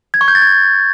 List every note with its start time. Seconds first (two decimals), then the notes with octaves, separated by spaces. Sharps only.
0.14 G#6
0.21 C#6
0.28 G6
0.35 A6
0.42 G#6